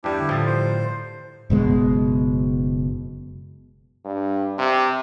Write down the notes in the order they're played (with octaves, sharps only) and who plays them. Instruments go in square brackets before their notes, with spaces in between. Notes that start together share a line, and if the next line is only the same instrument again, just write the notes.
[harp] E2 [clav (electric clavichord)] G2 G3 [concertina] D4 E4 G4
[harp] D3 A3
[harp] A2 A#5 A6 [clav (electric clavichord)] F3 G3 A3
[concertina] C5
[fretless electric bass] F#1 B2 G#3
[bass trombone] G2
C3